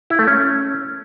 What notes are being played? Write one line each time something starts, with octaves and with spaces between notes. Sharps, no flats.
E4
A3
C#4